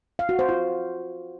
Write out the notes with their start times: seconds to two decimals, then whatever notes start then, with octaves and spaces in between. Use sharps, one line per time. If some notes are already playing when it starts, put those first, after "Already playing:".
0.19 F5
0.29 F#4
0.39 C5
0.49 F4